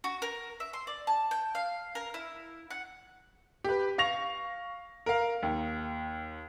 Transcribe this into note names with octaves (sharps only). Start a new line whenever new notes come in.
F#4
A#4
E5
C6
D5
A5
G5
F5
A#4
E4
F#5
G4 B4
F5 C#6 A#6 F7
A#4 F5
D#2